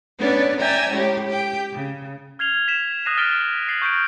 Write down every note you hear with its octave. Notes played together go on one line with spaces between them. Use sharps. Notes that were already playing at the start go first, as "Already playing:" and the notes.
B3 C#4 D4 B4 C#5 D5
D5 E5 G5 G#5 A#5 E6
A2 G#3 C#4 G4
G4 G5
C#3
F6 G#6 C7 F7 G7
B6 E7
D#6 F#6 A#6 C7 D#7 E7
F6 A6 B6 D7 G7
A6 C7 F#7
C#6 G6 A#6 D7